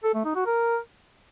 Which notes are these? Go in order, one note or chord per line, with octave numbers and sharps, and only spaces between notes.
A4
A3
D#4
F#4
A#4